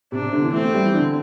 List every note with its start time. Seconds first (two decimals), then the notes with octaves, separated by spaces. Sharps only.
0.12 C3 D4
0.22 C3
0.33 D3
0.43 E3
0.53 A3 C4
0.64 A3
0.74 G3
0.84 E3
0.94 D3